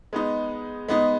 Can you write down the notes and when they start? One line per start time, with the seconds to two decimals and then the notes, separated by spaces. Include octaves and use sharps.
0.13 G#3 B3 D#4
0.89 G#3 B3 D#4